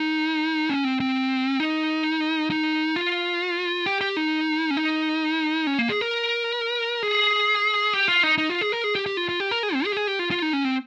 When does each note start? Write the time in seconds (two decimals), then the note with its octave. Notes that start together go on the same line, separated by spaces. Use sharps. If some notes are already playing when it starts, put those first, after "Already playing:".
Already playing: D#4
0.70 C#4
0.84 C4
1.00 C4
1.60 D#4
2.50 D#4
2.96 F4
3.86 G4
4.01 G4
4.17 D#4
4.71 C#4
4.77 D#4
5.67 C#4
5.78 A#3
5.90 G#4
6.01 A#4
7.03 G#4
7.93 G4
8.08 F4
8.23 D#4
8.38 D#4
8.49 F4
8.61 G#4
8.72 A#4
8.84 G#4
8.95 G4
9.06 G4
9.17 F4
9.29 F4
9.40 G4
9.51 A#4
9.63 G#4
9.74 C4
9.85 G#4
9.92 G4
9.97 G#4
10.07 G4
10.19 F4
10.31 F4
10.42 D#4
10.53 C#4
10.65 C4